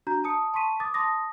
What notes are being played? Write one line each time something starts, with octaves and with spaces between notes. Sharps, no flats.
D4 F#4 A#5 G6
A5 D#6 C#7
A5 C6 C#6 B6 D#7
D6 D#6 A6
A5 C6 D#6 A#6